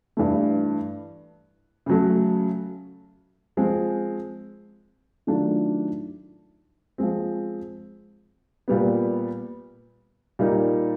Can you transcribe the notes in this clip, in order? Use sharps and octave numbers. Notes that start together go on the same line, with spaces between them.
G2 E3 A3
C#3 F#3 A3
F3 G#3 C4
D#3 F#3 A3 D4 F4
F3 G#3 C4
A#2 G3 B3
A#2 G3 A#3 D#4